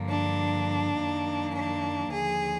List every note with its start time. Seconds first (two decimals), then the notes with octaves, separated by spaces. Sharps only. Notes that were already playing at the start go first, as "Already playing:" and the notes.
Already playing: G2 D3 F3 A#3
0.10 D4
0.96 F#2 D#3 F#3 A#3
1.54 D4
2.11 D#2 D3 F3 G#4